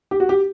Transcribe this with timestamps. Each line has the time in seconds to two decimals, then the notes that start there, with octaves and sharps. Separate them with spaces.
0.11 G4
0.20 F#4
0.29 G4